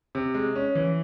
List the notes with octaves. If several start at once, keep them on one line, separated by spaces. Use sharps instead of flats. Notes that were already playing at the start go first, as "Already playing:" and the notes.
C3
G#3
C#4
E3